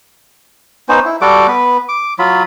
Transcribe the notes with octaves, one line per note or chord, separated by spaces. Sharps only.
B3 C#4 D#4 C5
E4
G3 F#4 A4 D6
B3 B4
D6
F#3 F4 B5